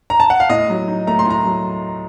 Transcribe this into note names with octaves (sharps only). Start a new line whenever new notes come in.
A#5
A5
F#5
F5
A2 D#5
F#3
D#4
A3 A#5
C6
A2 A#5
F#3